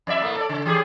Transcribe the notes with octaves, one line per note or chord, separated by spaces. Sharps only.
F2 D5 E5
A2 A3 A#3
A4 D5
C#3
E3 G4 G#4